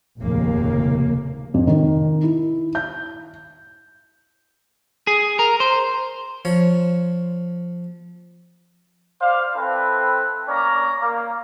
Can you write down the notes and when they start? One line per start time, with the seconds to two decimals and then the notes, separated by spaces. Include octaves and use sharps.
0.19 F1 A#1 D#2 C#3 A#3
1.54 F2
1.67 D#3
2.23 E4
2.75 G6
5.07 G#4
5.39 A#4
5.60 C5
6.45 F3 C#5
9.21 C5 D5 F5
9.55 C4 E4 A4 B4
10.48 A#3 C#4 D5 A#5
11.01 A#3